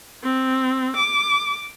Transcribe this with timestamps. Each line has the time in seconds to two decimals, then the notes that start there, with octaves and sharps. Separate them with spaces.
0.24 C4
0.96 D6